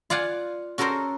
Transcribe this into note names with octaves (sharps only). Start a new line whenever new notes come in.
F4 D5 F5 F#5 G#5
C#4 F#4 A4 A#4 C5